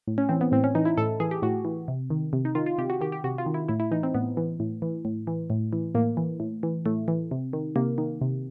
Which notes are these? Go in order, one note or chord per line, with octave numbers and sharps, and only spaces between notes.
A2
C#4
E3 C4
B3
A2 C4
C#4
E3 D#4
E4
A2 A4
E3 G#4
G4
A2 F#4
E3
C3
D#3
C3
D#4
D#3 F4
F4
C3 G4
F#4
D#3 G4
G4
C3 F#4
F4
D#3
E4
A2 E4
E4
E3 D#4
C4
A2 B3
E3
A2
E3
A2
E3
A2
E3
A2 A#3
E3
A2
E3
A2 A3
E3
C3
D#3
C3 A#3
D#3
C3